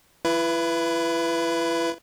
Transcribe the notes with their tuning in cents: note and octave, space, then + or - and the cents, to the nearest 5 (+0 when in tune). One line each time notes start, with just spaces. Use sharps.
E4 +35 B4 +0